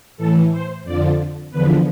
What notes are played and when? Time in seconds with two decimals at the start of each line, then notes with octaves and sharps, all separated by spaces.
0.17 A2 E3 A4
0.51 C5
0.84 F2 D3 F3 D5
1.51 E2 D3 F3 B4